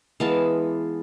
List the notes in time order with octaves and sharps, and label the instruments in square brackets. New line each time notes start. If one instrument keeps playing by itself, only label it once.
[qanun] E3 G#3 B3 F5 A5